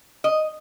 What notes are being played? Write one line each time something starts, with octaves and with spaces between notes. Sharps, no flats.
D#5